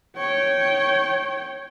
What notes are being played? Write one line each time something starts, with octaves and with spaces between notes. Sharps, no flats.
C#5 G5